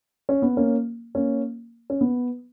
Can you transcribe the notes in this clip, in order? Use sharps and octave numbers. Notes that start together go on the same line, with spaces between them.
C#4
B3
A#3 C#4
A#3 C#4
C#4
B3